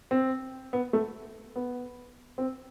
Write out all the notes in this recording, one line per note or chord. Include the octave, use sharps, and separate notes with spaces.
C4
B3
A3
B3
C4